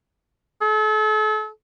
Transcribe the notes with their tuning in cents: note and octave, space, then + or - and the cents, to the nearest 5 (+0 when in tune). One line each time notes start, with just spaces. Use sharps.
A4 -40